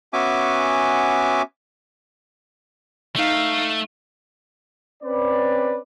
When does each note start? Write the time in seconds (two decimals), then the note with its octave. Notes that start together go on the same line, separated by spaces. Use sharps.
0.13 B3 C#4 F#4 E5 G#5 D6
3.16 A3 D#4 F5
5.03 C4 C#4 B4 D5